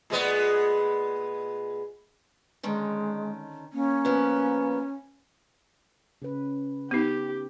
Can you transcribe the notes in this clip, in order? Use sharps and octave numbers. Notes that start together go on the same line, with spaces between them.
A#2 G#3 B3
D3 D#3 G#3 C#4
A#3 C#4
F3 B3
C#3 C#4 B4
B3 D#4 G4